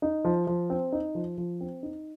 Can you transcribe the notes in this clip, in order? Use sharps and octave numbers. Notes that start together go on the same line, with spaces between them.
D#4
F3
F3
C4
D#4
F3
F3
C4
D#4